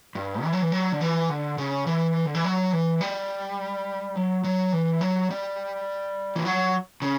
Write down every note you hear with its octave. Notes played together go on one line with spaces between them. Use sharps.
G2
E3
F#3
E3
F#3
D3
E3
D3
C#3
E3
D3
E3
F#3
E3
G3
F#3
F#3
E3
F#3
G3
E3
F#3
C#3